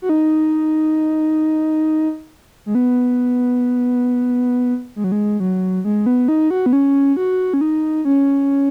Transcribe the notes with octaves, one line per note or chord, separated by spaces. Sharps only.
F#4
D#4
G#3
B3
G#3
F#3
G#3
F#3
G#3
B3
D#4
F#4
B3
C#4
F#4
C#4
D#4
C#4